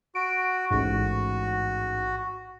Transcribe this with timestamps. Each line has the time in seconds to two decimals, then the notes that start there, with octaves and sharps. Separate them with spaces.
0.15 F#4 D7
0.71 A1 G#2 F#4